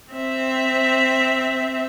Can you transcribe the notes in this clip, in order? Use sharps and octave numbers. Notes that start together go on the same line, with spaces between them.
C4 E5